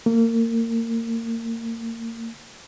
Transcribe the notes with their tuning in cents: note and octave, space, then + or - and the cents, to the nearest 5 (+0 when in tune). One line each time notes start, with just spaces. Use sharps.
A#3 -30